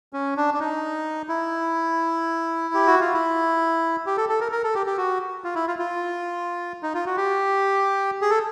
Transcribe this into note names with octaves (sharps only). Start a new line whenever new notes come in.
C#4
D4
D4
D#4
E4
G4
F#4
F4
E4
G4
A4
A4
A#4
A#4
A4
G4
G4
F#4
F4
E4
F4
F4
D#4
F4
F#4
G4
G#4
A4